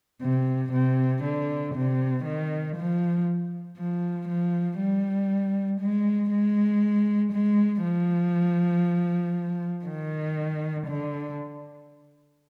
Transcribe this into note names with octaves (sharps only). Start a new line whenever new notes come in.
C3
C3
D3
C3
D#3
F3
F3
F3
G3
G#3
G#3
G#3
F3
D#3
D3